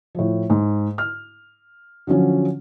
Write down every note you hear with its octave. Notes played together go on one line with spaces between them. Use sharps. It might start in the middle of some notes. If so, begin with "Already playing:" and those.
A2 F3
G#2
F6
D3 F3 F#3 C#4